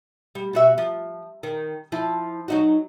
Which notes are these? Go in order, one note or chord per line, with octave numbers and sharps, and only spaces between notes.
G3
B2 F#4 E5
F3
D#3
F3 E4
F#3 D#4 F#4